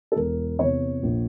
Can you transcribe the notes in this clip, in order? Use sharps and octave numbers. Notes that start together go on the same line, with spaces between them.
A4
E1 A#4
E2 C3 C#5
A#1